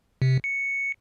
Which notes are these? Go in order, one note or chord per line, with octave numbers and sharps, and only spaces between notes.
C3
C#7